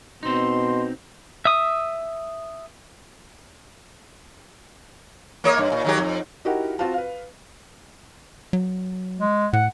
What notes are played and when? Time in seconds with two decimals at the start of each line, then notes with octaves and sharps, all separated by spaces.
0.23 B2 C4 D#4 C6
1.45 E5 D#6
5.44 A#3 C#5 D#5
5.58 G2
5.72 A#2
5.84 D#3 F#3 G4
5.98 F2
6.45 D#4 E4 F#4 G4 A#4 F#5
6.79 C4 F4 F#4 C5 F5 A5
6.94 B4 F5
8.53 F#3
9.20 G#3
9.53 A2 F#5